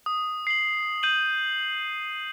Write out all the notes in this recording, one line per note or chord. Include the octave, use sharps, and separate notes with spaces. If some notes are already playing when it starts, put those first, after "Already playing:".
D#6
C7 F#7
G6 D#7 F#7